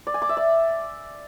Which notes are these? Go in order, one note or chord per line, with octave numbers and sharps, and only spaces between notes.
D5
G#5
D6
E5
D5